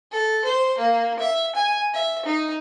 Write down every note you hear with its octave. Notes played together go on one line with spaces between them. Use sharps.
A4
C5
A#3
E5
G#5
E5
D#4